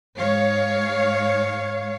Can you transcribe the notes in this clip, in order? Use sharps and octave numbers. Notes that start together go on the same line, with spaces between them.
G#2 C#5 F5